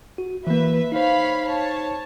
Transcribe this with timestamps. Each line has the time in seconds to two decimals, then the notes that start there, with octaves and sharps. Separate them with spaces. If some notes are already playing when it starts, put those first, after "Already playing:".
0.18 F#4
0.47 E3 A#3 B4 E5
0.92 D#4 C5 C#5 F5 B5
1.45 C#5 A5